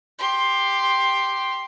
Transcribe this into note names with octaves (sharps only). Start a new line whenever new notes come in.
G4 C6